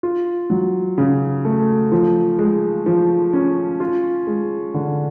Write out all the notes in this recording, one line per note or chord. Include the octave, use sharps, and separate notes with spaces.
F4
F#3
C#3
A3
F3
G#3
F3
C#4
F4
G#3
D3